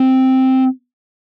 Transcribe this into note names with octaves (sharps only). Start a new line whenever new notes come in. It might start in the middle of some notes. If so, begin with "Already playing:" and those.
Already playing: C4